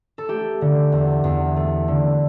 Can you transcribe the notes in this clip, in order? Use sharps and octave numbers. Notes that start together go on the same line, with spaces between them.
A4
A3 G4
D3
E2
E2
A3
D3